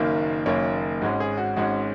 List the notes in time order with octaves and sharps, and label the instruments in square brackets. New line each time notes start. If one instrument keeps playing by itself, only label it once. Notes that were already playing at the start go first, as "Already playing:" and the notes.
Already playing: [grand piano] F#1 F#2 D#3 A#3
F#1 F#2 D#3 A#3 C#5
G#1 G#2 G#3 C#4 F#4
G#4
F#4
G#1 G#2 G#3 C#4 F#4